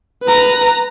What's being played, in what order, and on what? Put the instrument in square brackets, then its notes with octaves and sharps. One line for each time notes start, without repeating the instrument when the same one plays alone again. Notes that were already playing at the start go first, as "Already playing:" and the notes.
[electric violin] B4 A#5